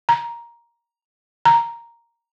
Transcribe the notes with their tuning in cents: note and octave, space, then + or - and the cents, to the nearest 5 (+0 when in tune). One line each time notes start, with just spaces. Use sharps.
A#5 +10
A#5 +0